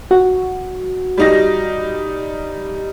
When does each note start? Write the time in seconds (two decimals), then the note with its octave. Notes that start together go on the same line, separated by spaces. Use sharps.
0.11 F#4
1.18 G3 D#4 A#6